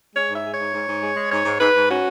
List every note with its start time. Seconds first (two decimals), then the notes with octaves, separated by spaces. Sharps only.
0.14 G#3 C#5
0.29 G#2 E5
0.43 G#3
0.53 C#5
0.58 G#2
0.73 G#2
0.87 G#2
1.01 G#3
1.16 G#3
1.30 G#2 C#5
1.45 G#2
1.60 G#2 B4
1.74 G#2
1.89 C#4 F#4